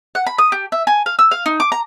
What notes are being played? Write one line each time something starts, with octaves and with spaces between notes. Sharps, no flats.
F#5
B5
D#6
G4
E5
G#5
F5
E6
F5
D#4
D6
A#5